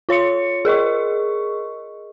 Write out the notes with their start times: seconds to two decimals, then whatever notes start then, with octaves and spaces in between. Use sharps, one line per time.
0.09 F4 C#5 C6 C#7
0.65 G#4 A#4 D#5 C#6